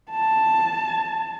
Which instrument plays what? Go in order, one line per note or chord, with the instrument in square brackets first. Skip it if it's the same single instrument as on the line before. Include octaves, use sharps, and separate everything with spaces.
[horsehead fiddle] A5